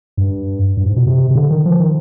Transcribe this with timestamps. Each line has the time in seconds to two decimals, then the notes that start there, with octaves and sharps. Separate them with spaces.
0.17 G2
0.77 G2
0.86 G#2
0.96 B2
1.07 C3
1.30 C3
1.35 D3
1.51 D#3
1.65 F3
1.80 D#3